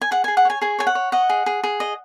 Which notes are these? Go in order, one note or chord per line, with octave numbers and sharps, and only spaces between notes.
G#5
G#4 F#5
G#4 G#5
F#5
C#5 G#5
G#4 G#5
C#5 G#5
F#5
C#5
D#5 F#5
G#4
G#4
G#4
D#5